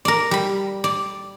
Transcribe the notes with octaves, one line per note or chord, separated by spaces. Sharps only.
A#4 D5
G3 B5
D5